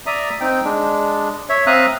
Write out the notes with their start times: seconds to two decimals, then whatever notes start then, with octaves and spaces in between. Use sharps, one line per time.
0.06 D5 E5 A#5 D#6
0.40 C4 D#4 G5
0.65 G#3 D4
1.49 C#5 E5
1.67 C4 E5 F5 A#5 D#6 F#6